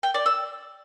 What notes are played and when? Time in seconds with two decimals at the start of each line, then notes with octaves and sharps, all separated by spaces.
0.03 G5
0.14 D5
0.26 E6